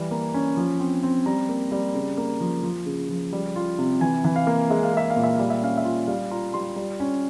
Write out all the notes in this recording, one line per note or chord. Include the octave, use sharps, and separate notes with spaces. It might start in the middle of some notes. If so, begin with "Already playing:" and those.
Already playing: E3 G3
A#3
C#4
F3
C4
C4
G3 A#5
A#3
G3
C#3
A#3
F3
F3
C#3
F3
G3
F4
C3
E3 G#5
E3
F5
A#3
G#3 E5
F5
G#3 E5
F5
A#2
E5
G3 F5
E5
C#4 F5
E5
F4
G3 F5
F4 A#5
G3 C6
G3
C#4